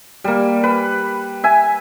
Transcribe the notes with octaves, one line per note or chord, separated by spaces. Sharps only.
G3 A#3
B4
E5 G#5